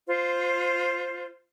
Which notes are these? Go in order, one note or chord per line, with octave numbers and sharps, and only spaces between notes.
F4 C5